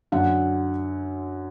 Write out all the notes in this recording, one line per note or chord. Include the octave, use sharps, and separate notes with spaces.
F#2 D3 F#3 F#5